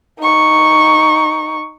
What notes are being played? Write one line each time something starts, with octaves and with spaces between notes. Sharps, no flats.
D#4 C#6